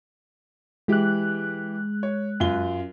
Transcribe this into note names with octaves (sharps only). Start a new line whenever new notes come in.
E3 G#3 G4 F#6
C#5
F#2 F4 G7